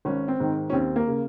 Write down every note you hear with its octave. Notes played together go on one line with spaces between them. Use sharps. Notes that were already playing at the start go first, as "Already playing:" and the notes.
G#1 C#4
C4
G#2 D#3
C#4
D#2 C4
A#3
C#3